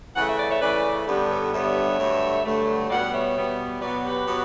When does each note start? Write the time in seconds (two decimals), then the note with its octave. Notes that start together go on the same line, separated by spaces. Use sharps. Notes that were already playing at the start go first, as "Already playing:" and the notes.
0.16 C#3 E3 A3 F#5
0.27 E5
0.38 D5
0.48 C#5 E5
0.61 C#3 E3 A3 B4 D5
1.07 G2 D3 G3 B3 G4 B4
1.30 A4 C#5
1.53 G2 D3 G3 B3 C#5 E5
1.99 G2 D3 F#3 A3
2.45 G2 D3 F#3 A3
2.90 B2 G3 B3 D5 F#5
3.13 C#5 E5
3.36 B2 G3 B3
3.81 B2 F#3 B3 B4 D5
4.04 G4 B4
4.27 B2 F#3 B3